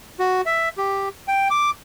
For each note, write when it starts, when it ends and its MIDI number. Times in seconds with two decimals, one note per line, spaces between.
0.20 0.41 66
0.46 0.69 76
0.78 1.09 67
1.28 1.48 79
1.50 1.70 86